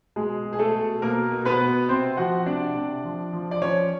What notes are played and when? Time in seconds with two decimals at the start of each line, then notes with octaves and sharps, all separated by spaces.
0.16 B2 G#3 G#4
0.45 B2
0.53 G#4
0.59 A3 A4
0.73 B2
1.02 B2 A#3 A#4
1.31 B2
1.45 B3 B4
1.60 B2
1.89 C3 C4 C5
2.17 F3 F#4 F#5
2.46 C3 D4 D5
2.75 C3
3.04 F3
3.33 F3
3.51 D5
3.62 F3 C#4 C#5